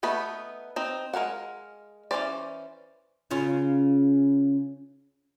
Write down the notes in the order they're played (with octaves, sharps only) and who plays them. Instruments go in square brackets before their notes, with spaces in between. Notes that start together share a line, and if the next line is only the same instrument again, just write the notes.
[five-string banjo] A3 B3 D#4 B4
C4 D#4
G#3 A#4 F5 F#5
E3 A3 C#4 C5 D5
[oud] C#3 C#4 F4